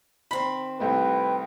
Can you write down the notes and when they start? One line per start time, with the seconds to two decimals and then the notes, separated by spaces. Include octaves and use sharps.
0.31 D#3 C4 B5
0.80 C2 A3 B4 G5